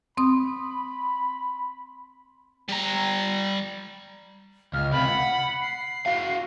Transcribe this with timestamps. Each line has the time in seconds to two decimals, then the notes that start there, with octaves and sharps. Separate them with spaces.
0.17 C4 B5 C6 D#6
2.69 G3 A#5
4.73 C#2 F6
4.92 C3 F4 B5
5.05 F#5
5.61 C7
6.06 F#4 F5